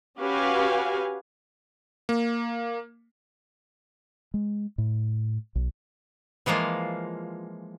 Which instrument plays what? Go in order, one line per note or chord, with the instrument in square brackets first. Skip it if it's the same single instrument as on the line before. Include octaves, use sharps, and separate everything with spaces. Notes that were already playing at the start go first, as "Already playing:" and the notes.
[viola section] C#4 F#4 G4 B4 F5 G#5
[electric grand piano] A#3
[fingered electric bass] G#3
A2
B1
[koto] E3 F3 G#3 A#3 F4